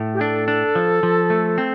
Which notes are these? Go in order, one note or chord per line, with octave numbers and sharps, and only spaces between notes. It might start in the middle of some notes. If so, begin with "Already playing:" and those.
Already playing: A2 A3
G4
D4 A4
D4
F3
F3
A3
C4